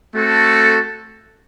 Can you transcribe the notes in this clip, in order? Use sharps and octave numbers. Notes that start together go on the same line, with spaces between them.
A3 C4 F#4 A4